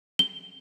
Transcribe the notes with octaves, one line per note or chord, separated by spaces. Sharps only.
G7